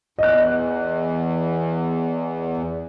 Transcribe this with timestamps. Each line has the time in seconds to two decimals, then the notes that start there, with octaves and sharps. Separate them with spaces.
0.19 E2 D#5 F#6